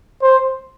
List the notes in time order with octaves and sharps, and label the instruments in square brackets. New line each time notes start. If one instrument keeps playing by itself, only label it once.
[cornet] C5